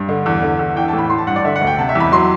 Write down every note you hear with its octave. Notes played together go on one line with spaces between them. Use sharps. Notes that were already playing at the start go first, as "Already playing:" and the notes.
Already playing: G2
D3
E2
D3
E2
E3 G5
A5
A2
B5
E3 C6
A5
G2 F#5
D5
D3 E5
F#5
D2
G5
C3 A5
E5
E2 B5
F#3 C6